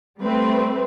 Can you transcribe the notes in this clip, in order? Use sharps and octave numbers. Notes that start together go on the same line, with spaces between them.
G3 A3 C4 B4